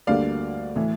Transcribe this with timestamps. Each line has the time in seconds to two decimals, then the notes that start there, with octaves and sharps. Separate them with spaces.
0.07 D2 D3 G3 A#3 D5 F5
0.76 A2 E3